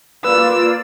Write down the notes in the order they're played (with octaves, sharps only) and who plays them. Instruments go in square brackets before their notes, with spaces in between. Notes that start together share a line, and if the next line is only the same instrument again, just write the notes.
[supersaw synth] A#3 F4 D5 [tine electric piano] B4 [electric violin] E6